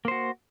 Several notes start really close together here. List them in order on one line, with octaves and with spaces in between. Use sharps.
A#3 C5 F#4